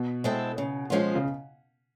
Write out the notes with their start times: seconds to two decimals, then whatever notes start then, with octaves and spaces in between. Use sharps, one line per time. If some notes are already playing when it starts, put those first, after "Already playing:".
Already playing: B2
0.24 G#3 C4 E4 A4
0.58 C#3
0.90 F3 G#3 C#4 F4
1.15 C#3